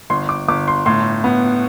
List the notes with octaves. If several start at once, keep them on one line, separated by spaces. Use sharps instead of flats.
G1 C6
D6
G1 D6
C6
A2 C6
B3